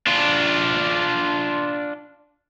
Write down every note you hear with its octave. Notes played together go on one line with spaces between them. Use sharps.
D4 F4